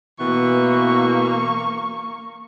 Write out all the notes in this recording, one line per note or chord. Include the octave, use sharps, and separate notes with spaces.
B2 E3 A#3 C#6